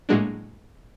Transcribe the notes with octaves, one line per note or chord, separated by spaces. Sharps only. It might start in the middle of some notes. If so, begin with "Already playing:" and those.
A2 F#3 G#3 A#3 D4